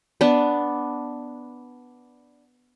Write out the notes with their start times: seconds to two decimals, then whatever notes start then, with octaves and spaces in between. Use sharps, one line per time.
0.21 B3 D4